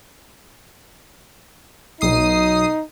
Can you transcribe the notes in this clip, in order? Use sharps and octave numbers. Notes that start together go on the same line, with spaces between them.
B1 D#4 D#6 C7